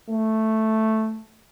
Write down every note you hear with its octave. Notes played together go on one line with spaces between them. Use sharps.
A3